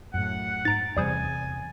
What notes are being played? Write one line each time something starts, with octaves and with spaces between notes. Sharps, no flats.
F#2 A2 F#5
G#2 A#5 A6 D7
E2 C3 G3 G#4 C5 G#5